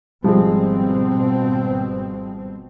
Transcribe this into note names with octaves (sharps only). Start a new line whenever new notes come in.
G#1 B2 F3 G3 G#3 C4